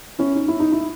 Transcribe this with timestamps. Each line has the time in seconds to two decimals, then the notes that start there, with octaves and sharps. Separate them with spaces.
0.19 C#4 E4
0.35 D#4
0.48 E4
0.60 D#4
0.73 E4